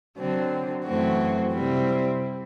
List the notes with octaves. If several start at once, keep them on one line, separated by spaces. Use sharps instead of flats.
D3 F#3 C4
F#2 E3 A3 C4 F#4
C3 G3 C4 E4